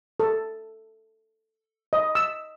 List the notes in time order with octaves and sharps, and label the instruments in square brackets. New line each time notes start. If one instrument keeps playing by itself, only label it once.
[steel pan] A4
D#5
E6